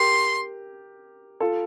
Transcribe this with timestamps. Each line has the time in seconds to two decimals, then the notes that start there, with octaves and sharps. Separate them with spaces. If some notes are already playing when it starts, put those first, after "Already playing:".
Already playing: G4 A#4 C6
1.40 F4 A4